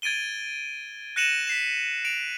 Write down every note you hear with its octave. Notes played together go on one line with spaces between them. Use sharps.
G#6 A6 D7 D#7 G7
F#6 A#6 C#7 D#7 E7 F#7
B6 C7 E7
D7 F7